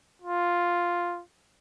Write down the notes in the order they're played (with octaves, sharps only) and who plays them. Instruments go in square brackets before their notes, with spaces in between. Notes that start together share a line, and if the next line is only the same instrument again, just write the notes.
[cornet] F4